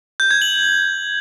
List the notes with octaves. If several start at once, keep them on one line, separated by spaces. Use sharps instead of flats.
G6
G#6
F#7